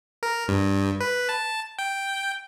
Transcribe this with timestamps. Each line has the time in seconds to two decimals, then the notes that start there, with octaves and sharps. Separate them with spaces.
0.23 A#4
0.48 G2
1.00 B4
1.29 A5
1.79 G5